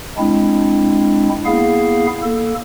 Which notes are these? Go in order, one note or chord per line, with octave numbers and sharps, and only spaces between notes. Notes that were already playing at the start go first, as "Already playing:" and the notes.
G#3 C4 D4 E4
A#3 B3 E4 G#4 F5
A#3 A4